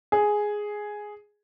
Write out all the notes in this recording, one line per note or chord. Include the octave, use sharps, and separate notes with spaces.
G#4